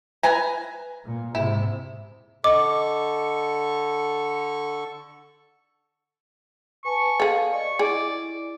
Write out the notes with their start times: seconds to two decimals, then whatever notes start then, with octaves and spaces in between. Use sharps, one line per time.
0.23 B4 G#5 A#5
1.05 A#2
1.35 G#2 C3 E4
2.44 D3 A4 D#5 C#6 D6
6.85 B4 G#5 A5 C#6
7.20 G#4 A4 F5
7.52 D5 D#5 C#6
7.79 E4 G#4 D5